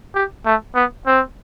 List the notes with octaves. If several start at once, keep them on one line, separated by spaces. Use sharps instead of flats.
G4
A3
B3
C4